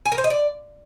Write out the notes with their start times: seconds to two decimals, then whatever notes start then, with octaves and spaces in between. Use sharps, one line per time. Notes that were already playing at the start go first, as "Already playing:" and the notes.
0.06 G#5
0.12 A#4
0.18 C5
0.24 D#5
0.30 D5